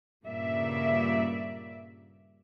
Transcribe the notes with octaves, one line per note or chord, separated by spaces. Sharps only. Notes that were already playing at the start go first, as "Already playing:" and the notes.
G2 A#2 C#3 A#3 D5 E5